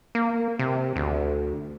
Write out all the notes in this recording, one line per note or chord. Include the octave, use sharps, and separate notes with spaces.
A#3
C3
D2